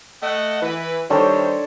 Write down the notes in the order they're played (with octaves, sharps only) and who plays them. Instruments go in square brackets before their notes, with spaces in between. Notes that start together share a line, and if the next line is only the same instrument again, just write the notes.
[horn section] A3 D#5 F#5
E3 B4
[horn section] D#3 G3 C5 [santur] D4 A4 C#5